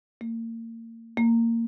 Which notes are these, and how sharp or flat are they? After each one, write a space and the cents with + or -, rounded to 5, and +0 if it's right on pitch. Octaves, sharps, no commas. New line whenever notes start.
A#3 -35
A#3 -20